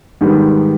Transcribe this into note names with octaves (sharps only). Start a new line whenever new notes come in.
G#2 D#3 G3 B3